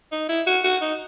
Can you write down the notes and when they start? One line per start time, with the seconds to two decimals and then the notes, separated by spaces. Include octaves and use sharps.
0.12 D#4
0.29 E4
0.47 F#4
0.64 F#4
0.81 D#4